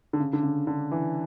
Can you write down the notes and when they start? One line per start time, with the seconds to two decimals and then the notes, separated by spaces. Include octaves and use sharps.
0.13 D3
0.20 C#3
0.33 D3
0.43 C#3
0.67 D3
0.91 E3